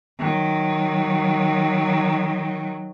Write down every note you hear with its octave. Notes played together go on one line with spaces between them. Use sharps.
D#3 F#3